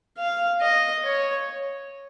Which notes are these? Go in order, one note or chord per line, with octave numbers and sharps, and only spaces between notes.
F5
D#5
C#5